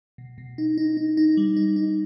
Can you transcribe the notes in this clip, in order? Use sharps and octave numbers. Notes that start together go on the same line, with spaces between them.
B2
B2
D#4
D#4
D#4
D#4
G3
D#4
D#4